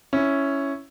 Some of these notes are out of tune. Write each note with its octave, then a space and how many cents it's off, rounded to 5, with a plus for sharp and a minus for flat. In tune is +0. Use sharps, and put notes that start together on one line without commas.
C#4 +0 E4 +0